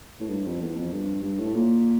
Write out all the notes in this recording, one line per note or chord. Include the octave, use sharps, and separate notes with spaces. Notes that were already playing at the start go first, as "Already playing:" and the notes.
A2
G2
F2
E2
F2
G2
G2
A2
A#2